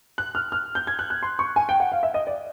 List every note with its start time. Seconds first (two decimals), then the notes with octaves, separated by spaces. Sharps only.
0.18 F#6
0.35 F6
0.52 F6
0.75 G6
0.87 G#6
0.99 F#6
1.10 F#6
1.23 C6
1.39 C#6
1.56 G#5
1.69 G5
1.80 F#5
1.92 F5
2.03 E5
2.14 D#5
2.27 D5